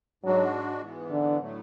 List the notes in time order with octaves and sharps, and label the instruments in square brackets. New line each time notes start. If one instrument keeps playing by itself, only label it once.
[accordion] G#2 G#3 D4 F#4 [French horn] F#3
[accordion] G#2 E3 B3
[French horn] D3
[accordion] A2 F#3 A3